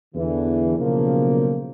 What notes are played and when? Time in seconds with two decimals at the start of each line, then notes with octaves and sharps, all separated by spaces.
0.15 E2 D3 E3
0.78 B1 C#3 F3 A#3